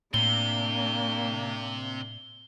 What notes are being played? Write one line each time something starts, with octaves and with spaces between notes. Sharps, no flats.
A2 C3 A#3 D4 G7